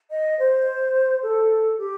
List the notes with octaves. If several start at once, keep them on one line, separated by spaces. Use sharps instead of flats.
D#5
C5
A4
G4